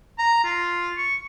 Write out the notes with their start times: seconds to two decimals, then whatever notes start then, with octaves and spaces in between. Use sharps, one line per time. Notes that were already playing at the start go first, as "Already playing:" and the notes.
0.18 A#5
0.44 F4
0.97 C#6